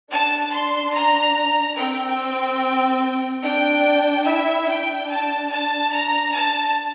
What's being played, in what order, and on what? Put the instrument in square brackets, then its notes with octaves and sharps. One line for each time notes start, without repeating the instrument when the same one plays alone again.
[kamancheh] D4 [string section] A5
[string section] C6
A#5
[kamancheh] C4 [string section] G5
[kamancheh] D4 [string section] G5
[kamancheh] E4 [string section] E5
[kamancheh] D4 [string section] G5
[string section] A5
A5
A#5
A5